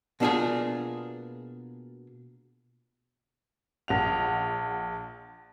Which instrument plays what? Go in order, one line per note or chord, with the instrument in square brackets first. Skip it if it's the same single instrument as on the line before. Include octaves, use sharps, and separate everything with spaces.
[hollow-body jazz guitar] B2 A#3 D4 E4 F4 G#4
[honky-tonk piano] A#1 F#5 F7